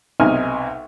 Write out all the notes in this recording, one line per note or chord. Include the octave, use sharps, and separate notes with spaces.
B1 C3 D#4 G#5 F6